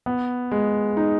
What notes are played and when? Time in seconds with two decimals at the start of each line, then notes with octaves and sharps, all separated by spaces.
0.06 B3
0.51 G#3
0.97 D#4